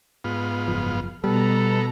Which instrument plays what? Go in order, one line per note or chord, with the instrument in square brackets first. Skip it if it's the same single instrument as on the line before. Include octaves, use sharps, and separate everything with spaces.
[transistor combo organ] G#2 B3 F4
[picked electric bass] F#1 F3
[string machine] B2 A#5 [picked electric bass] G3 [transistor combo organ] B3 [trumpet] A4